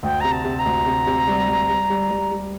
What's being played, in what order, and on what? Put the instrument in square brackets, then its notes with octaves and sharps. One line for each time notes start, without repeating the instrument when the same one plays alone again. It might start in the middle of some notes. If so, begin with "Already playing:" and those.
[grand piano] D2 [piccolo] G5
[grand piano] C3 [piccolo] A#5
[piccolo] A5
[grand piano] C3
[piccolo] A#5
[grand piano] D2
C3
C3
G3
G3
G3
G3
G3
G3